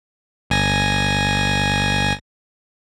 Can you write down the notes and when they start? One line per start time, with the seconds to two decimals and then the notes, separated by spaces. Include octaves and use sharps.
0.50 G1 G#5 A#6